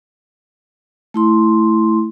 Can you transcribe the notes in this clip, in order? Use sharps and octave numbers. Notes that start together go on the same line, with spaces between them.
A3 E4 C6